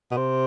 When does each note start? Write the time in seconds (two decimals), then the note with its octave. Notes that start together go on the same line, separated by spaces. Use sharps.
0.11 B2
0.17 C3